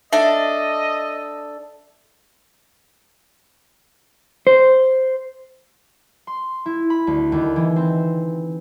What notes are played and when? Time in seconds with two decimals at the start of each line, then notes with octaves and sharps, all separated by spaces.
0.13 D4 A4 D#5 E5
4.47 C5
6.27 C6
6.66 E4
6.90 B5
7.07 D2
7.32 D#2
7.56 E3
7.76 C4